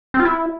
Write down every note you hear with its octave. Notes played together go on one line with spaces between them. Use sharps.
C4
F4
E4